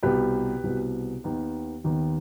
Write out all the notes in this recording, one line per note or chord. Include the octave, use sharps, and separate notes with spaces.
C2 B2 B3 G4 B4
C2 B2 B3
D#2 D#3 B3
D#2 D#3 B3